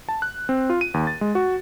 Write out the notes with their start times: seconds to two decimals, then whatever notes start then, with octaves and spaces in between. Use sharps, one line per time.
0.09 A5
0.22 F#6
0.49 C4
0.70 F4
0.81 D#7
0.94 D#2
1.07 A6
1.21 G#3
1.35 F#4